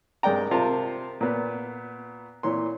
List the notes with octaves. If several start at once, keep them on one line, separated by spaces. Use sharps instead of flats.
G2 G#3 A#4 D5 G5 A#5
C3 F4 A#4 C5 A5
A#2 B3
A#2 E3 C#5 C6